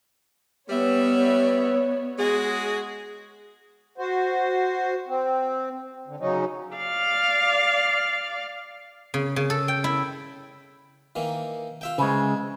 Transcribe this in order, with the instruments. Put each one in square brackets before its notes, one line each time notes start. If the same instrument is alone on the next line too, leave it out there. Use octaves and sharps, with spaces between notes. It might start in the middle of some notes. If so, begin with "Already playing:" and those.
[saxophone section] G3 E5 [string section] B3 C#5
[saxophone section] G#3 F#4 G#4
[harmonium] F#4 C5
C4
D3
C#3 F#3 C#4 D#4
[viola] D5 F5
[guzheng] C#3
C#3
A4
G5
E4
[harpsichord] D#3 E3 A#3
F4 E5 G5
[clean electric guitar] C#3 G#3 [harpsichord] E3 C4